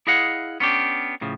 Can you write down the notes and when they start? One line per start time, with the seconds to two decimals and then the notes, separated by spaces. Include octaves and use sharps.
0.07 E4 G#4 D#5 F5 F#5
0.60 B3 C#4 D4 G4
1.21 A2 C#3 F3